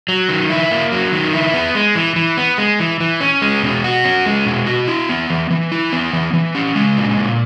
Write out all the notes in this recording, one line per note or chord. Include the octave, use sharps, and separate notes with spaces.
F#3
D#3
E4
A#3
F#3
D#3
E4
B3
G#3
E3
E3
B3
G#3
E3
E3
C#4
G#3
B2
F#4
C#4
G#3
B2
F#4
E4
B3
E3
E3
E4
B3
E3
E3
C#4
G#3
A#2
A#2